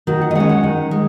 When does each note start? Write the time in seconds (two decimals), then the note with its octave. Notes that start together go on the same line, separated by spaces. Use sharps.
0.07 D#3 F#4
0.22 F#5
0.31 D#5
0.35 G#3 C#4 F#5
0.49 F#5
0.64 D#3
0.91 G#3